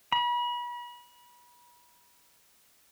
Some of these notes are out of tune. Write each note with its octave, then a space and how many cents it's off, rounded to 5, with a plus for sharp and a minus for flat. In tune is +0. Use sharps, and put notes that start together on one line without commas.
B5 -35